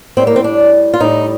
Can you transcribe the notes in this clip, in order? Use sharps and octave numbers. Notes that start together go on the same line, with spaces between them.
A2 G3 C4
A#3
C4
D4
F4
A2 G3 D#4